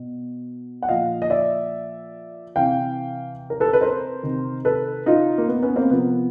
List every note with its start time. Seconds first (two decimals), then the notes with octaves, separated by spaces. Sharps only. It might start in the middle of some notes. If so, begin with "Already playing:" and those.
Already playing: B2
0.82 F#5
0.89 A#2 F3 D#5 F5
1.22 D#5
1.30 D5 E5
2.56 C3 E3 F5 G5
3.50 A#4
3.60 A4 B4
3.73 B4
3.81 A#4 C5
4.23 C3 D#3
4.65 A4 B4
5.06 D#4 F4
5.38 A#3
5.48 B3
5.62 B3 C#4
5.76 A#3 C4
5.90 C3 F3 B3